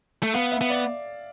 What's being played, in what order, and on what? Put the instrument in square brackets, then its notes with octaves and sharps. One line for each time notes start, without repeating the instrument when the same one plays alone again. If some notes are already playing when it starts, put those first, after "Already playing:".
[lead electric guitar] A3
[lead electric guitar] B3 [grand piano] F5
[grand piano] E5
[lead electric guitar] B3
[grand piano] D5